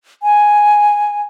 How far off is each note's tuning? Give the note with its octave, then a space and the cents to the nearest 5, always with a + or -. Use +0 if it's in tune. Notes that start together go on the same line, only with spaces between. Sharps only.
G#5 +0